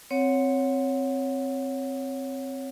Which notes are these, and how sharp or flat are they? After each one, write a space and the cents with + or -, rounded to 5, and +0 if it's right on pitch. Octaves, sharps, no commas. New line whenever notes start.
C4 +0 C#5 +0 F#5 -10